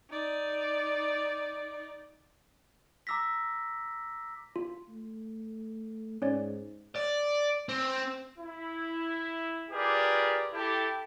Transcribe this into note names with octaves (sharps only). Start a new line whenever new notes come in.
D#4 D5
A#5 D6 E6 A#6 B6
F4
A3
G#2 C#4 C#5 D5
D5
C4
E4
F4 G4 G#4 A#4 B4 D5
E4 G4 A4